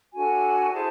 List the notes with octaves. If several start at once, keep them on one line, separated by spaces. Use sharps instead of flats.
D4 F#4 A4 G#5
E4 G#4 C5 A5